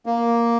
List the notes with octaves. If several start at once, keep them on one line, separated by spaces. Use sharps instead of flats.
A#3